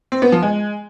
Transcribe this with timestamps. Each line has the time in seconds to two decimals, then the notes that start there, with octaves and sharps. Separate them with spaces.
0.12 C4
0.22 B3
0.32 F3
0.43 G#3